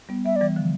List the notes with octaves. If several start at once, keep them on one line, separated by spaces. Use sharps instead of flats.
G3 B3
G3 B3 E5
D5
E3 G3
D3 F3